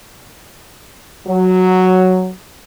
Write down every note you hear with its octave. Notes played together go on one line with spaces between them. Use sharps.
F#3